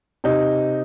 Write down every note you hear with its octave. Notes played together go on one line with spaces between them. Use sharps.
C3 D#4